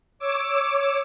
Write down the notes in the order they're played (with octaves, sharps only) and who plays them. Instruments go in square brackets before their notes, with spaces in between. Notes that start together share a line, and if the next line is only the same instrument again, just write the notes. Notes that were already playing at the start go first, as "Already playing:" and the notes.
[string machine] C#5 D6 E6